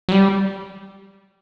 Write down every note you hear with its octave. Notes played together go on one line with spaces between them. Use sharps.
F#3
G3